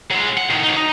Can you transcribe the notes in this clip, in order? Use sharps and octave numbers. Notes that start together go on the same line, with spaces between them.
F#3 G#3
F#5
A2 D#3
F#3 D#4
D#4